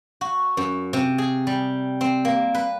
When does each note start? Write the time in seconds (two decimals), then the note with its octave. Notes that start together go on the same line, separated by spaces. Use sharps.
0.21 F#4
0.57 F#2
0.93 C3
1.18 G#4
1.47 G3
2.01 C4
2.25 A#3
2.54 B4